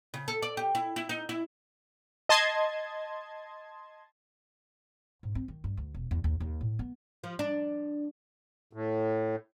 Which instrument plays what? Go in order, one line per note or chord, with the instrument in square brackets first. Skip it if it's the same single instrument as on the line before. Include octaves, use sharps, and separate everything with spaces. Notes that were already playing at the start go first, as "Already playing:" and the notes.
[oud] C#3
A4
D5
G4
E4
E4
D#4
E4
[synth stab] D#5 A5 C6 G#6
[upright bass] G#2
C4
D#3
G2
D2
E1
E2
D#2
D#2
A2
B3
[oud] F3
D4
[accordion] A2